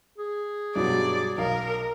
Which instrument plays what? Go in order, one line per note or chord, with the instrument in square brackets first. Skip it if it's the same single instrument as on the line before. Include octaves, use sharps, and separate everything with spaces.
[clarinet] G#4
[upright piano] G2 B2 F#3 [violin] D5
[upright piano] B1 F5 [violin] A#4